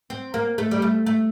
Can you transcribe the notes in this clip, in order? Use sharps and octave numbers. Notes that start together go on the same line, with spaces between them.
C4
A#3
A3
G3
A3
A3